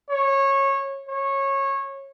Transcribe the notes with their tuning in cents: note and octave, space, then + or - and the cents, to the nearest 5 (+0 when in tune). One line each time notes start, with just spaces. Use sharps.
C#5 -20
C#5 -20